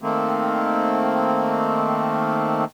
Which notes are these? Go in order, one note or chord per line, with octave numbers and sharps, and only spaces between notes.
D#3 A3 A#3 C4